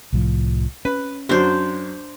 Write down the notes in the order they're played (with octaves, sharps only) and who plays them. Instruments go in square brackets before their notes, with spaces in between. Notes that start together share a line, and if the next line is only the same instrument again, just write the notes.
[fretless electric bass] C2 A2 F3
[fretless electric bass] C#4 [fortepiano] B4
[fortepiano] F#2 F#3 [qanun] D4 C5